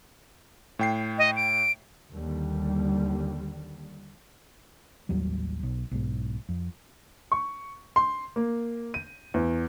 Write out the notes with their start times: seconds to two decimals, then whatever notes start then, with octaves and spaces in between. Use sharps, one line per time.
0.79 A2 G5 C7
1.18 D#5
1.36 D7
2.15 D#2 D3 G3
5.09 A1 D#2 F#3 G3
5.63 B1
5.91 B1 G#2
6.49 F2
7.32 C#6
7.96 C6
8.36 A#3
8.94 D#7
9.34 E2